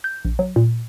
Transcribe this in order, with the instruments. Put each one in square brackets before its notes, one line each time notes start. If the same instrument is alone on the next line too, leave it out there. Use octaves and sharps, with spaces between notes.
[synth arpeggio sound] G6
A#1
F#3
A#2